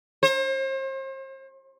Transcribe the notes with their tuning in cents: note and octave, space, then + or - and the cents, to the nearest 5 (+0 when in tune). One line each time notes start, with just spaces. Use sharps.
C5 +40